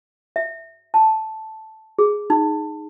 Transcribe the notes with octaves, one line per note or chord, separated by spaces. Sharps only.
E5
A5
G#4
D#4